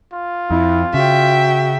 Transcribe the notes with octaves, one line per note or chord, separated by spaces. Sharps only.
F4
F2 E4
C#3 F#4 E5 G5